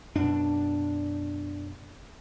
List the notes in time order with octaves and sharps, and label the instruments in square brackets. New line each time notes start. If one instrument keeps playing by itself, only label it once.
[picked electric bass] F#2 B2 [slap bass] D4